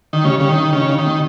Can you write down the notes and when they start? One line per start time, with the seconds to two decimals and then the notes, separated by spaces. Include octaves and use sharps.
0.13 D#3
0.24 C#3 G3
0.40 C#3 G4
0.49 D#3
0.57 D#4
0.73 C#3 D#4
0.89 D#4
0.98 D#3
1.06 C4